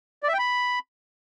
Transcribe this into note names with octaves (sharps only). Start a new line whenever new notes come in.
D5
E5
G5
B5